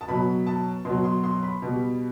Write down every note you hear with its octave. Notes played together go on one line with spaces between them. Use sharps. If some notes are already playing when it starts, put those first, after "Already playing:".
A5
B2 F#3 B5
A5
B2 F#3 C6
C6
C6
B5
B2 G3